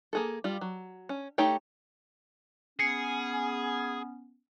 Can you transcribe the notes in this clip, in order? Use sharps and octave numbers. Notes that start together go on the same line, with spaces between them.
A#3 G#4 A4
G3 F4
F#3
C#4
A3 D#4 G4 C#5 G5
B3 C#4 G#4 C7 C#7